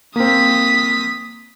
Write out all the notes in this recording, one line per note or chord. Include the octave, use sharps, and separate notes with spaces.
A#3 C4 D#6 B6